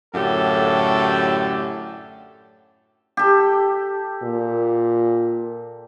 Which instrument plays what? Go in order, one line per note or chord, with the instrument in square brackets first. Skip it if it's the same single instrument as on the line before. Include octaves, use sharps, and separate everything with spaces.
[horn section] F#2 A2 D3 G4 A4
[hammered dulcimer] G4 A4
[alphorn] A#2